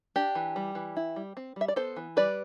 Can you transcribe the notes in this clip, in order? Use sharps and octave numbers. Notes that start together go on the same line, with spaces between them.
D4 G4
E3
G3
E3
E4
G3
C4
G3 E5
D5
B3 A4 C5
E3
G3 B4 D5